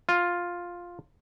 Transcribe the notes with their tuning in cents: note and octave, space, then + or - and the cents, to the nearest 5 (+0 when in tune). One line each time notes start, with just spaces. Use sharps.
F4 +5